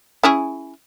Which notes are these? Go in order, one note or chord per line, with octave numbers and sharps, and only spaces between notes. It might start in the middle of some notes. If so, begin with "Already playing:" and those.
C#4 E4 G#4